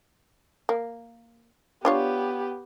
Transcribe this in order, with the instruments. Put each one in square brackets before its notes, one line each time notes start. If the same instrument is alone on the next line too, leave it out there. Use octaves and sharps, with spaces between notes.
[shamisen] A#3
[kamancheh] B3 G4 [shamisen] D4 F4 C#5